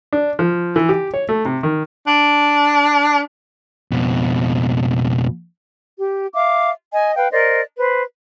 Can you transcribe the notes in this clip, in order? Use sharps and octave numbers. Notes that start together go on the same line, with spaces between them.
D4
F3
E3
G4
C#5
A3
C3
D#3
D4
F2 B2
G4
E5 F5 D6
D#5 G#5
B4 F5 G5
A#4 C5 D5 D#5
B4 C5